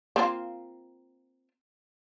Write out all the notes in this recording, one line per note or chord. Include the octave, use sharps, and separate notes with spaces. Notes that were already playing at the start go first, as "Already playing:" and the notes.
A#3 C4 F4